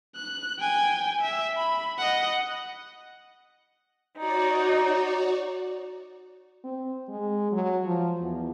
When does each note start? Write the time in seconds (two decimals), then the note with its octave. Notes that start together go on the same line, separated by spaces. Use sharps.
0.16 F#6
0.59 G5 G#5
1.22 E5
1.57 B5
1.98 D#5 F#5
4.16 D#4 F#4 C#5 D5
6.64 C4
7.09 G#3
7.52 F#3
7.85 F3
8.20 E2